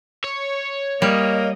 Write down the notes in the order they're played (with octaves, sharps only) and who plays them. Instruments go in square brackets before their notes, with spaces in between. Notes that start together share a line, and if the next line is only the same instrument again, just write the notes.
[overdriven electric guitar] C#5
[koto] G3 [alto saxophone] A#3 [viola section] D#5